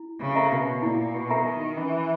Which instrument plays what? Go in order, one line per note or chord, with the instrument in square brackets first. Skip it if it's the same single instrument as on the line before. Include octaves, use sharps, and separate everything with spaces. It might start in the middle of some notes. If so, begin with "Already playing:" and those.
Already playing: [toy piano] E4
[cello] C#3
[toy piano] A#4 E5 A#5
[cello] B2
[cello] A#2 [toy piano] E4
[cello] B2
[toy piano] A#4 E5 A#5
[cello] D#3
[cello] E3 [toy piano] C#4